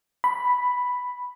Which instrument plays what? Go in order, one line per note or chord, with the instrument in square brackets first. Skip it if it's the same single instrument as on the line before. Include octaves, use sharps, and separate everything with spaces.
[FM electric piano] B5